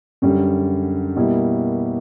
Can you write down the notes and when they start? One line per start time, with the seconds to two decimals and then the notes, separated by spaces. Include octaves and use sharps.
0.22 F#2 D3 G3
1.16 B2 G3 A#3 E4